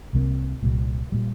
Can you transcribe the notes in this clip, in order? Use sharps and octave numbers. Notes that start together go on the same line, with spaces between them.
C2 C3 F3 A#3
C2 A#2 G3
A#2 G3